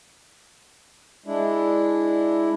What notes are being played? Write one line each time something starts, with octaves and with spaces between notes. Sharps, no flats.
G#3 D4 E4